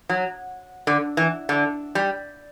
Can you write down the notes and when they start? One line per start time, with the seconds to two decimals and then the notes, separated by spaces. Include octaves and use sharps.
0.09 F#3
0.87 D3
1.17 E3
1.49 D3
1.95 G3